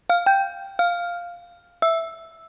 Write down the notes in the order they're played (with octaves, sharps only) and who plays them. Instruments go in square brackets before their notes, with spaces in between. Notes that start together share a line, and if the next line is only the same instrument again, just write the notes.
[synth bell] F5 F6
G5 G6
F5 F6
E5 E6